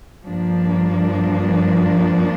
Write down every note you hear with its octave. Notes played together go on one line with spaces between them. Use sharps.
G2 F3 A#3 D4